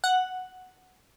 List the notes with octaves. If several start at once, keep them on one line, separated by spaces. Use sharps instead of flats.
F#5